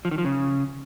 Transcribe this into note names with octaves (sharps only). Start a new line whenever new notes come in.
F3
D#3
F3
C#3